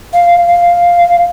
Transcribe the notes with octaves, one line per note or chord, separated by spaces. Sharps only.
F5
F5